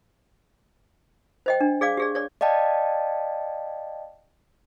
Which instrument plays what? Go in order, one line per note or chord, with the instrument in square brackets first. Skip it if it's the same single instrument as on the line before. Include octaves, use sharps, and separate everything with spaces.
[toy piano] C5 D#5 G5
D4
G#4 D5 F5 D6
G4 G#4 D5
C#5 D5
[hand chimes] D5 D#5 F5 G5 A5